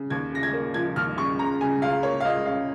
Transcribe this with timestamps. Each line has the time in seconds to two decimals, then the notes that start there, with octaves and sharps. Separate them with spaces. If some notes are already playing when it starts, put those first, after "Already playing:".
Already playing: C#3
0.10 D#2 G#6
0.31 C#3 A#6
0.43 G#6
0.53 A#3
0.74 F3 G#6
0.96 D#2 F6
1.17 C#3 C#6
1.39 C#2 A#5
1.61 C#3 G#5
1.82 C#2 F5
2.03 A#3 C#5
2.20 F5
2.24 C#2 D#5
2.46 C#3 F5